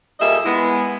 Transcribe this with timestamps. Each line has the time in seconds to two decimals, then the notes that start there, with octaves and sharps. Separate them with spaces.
0.20 F2 G3 A#3 G#4 D#5 E5
0.44 G#3 B3 E4